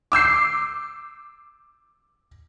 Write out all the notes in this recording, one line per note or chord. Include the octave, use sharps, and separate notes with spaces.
D6 E6 G6 C7